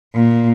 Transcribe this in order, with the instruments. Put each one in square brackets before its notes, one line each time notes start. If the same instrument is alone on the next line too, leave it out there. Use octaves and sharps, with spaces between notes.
[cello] A#2